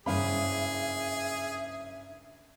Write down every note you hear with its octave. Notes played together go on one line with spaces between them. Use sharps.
F#1 G2 C#4 G#4 E5 F5 B5